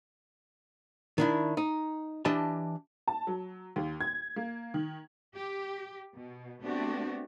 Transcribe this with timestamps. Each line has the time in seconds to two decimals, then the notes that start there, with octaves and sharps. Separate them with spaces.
1.18 D#3 D4 E4
1.57 D#4
2.25 E3 D4 G4 D#5 A5
3.08 A5
3.27 F#3
3.76 D#2
4.01 G#6
4.36 A#3
4.74 D#3
5.33 G4
6.15 B2
6.62 A3 B3 C4 D4 F#4 G4